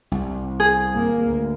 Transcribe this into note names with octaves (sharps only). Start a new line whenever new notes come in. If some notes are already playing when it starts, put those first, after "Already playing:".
C2
G#4
G#1 A#3
D2